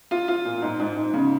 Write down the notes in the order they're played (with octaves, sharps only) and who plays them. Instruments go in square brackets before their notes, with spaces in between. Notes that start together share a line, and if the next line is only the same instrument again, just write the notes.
[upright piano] F4
F4
A#2
G#2
G#2
G#2
C#3